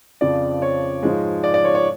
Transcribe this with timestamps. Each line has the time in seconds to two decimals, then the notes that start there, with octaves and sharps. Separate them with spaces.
0.21 F2 C#3 F3 D5
0.62 C#5
1.03 G#2 F3 G#3
1.44 D5
1.54 D5
1.64 C#5
1.75 C#5